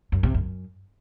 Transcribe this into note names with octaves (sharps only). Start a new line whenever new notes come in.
F#2
C3
F#2